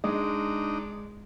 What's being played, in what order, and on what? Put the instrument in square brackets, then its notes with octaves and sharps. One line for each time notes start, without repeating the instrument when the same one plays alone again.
[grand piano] G#3 [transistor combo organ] D4 D#4